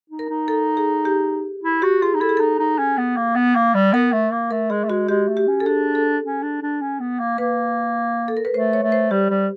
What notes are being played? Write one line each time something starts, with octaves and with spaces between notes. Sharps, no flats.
D#4
A#4
D#4
A4
G#4
G4
E4
F#4 G4
F4 G#4
D#4
E4 A4
G#4
D#4 A4
D#4
C#4
B3
A#3
B3
A#3
G3
B3 A#4
A3
A#3
A3 A#4
G#3 G#4
A3
G#3 F#4
G#3 G4
A3
G4
C#4
A4
D4 G#4
A4
C#4
D4
D4
C#4
B3
A#3
A#3 B4
A4
A#4
B4
A3 C5
C#5
A3
C5
G3 G4
G3